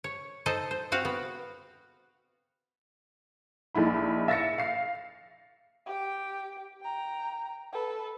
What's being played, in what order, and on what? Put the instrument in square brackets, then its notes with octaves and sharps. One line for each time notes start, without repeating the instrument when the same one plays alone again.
[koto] C#5
D#4 A4 C5 D#5
C5
C4 F#4 F5
B3
[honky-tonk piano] A#1 D#4 E4 B5
E5 A6 A#6 C#7
F5 C7
[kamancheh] G4 G5
G5 A#5
A4 B4